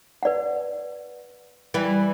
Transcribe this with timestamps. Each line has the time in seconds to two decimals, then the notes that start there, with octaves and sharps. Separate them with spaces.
0.23 B4 D5 F#5
1.74 E3 G3